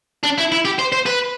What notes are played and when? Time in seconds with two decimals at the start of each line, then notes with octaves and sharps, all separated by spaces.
0.24 D4
0.38 E4
0.52 E4
0.65 G4
0.79 C5
0.92 C5
1.06 B4